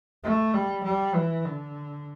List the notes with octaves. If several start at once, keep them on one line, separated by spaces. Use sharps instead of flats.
A3
G3
G3
E3
D3